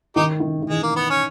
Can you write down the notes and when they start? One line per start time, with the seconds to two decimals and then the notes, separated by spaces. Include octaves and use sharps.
0.16 D#3 D#4 G4
0.40 D#3
0.63 D#3
0.69 E3 G#3
0.83 A#3
0.96 B3
1.10 C#4